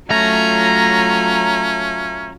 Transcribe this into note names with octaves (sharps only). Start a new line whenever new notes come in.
F#3 A3 C#4 F4 A#5